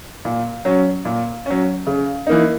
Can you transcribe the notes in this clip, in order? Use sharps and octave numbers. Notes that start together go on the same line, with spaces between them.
A#2
F#3 C#4
A#2
F#3 C#4
C#3
E3 A#3 D#4